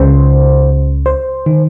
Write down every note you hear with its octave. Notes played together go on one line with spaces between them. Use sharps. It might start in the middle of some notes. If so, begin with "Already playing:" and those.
Already playing: C#2 C#3 C5
C5
D#3